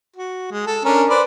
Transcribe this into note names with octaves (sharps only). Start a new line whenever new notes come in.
F#4
G#3
A4
C#4 D4 A#4
B4 C5 D5